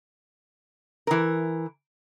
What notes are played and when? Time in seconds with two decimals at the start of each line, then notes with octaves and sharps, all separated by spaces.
1.07 E3 A#4